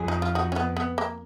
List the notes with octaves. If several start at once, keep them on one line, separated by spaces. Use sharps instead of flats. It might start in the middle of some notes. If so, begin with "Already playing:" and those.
Already playing: F2 G#4
D#4
F4
D#4 F#4
C#4
B3
B3
A#3